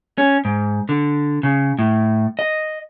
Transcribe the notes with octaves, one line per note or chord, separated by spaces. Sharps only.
C#4
G#2
D3
C#3
A2
D#5